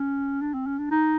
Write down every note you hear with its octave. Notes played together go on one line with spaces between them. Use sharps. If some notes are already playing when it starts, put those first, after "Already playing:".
Already playing: C#4
D4
C4
C#4
D4
D#4